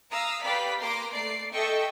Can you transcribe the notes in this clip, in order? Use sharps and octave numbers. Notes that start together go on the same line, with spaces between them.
F5 A#5 D#6 E6
G4 B4 D5 F5 B5 B6
A#3 A#5 C6 D6
A3 D5 C7 D7
A4 D#5 E5 G5 C#6